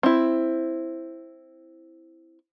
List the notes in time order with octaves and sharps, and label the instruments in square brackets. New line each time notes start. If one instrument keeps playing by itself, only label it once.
[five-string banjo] C4 E4